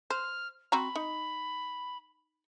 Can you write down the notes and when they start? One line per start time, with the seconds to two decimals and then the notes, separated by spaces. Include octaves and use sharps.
0.10 C5 F6
0.72 C4 F#4 A#5 B5
0.96 D#4